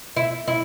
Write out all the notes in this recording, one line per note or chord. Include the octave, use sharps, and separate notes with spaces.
E4
E4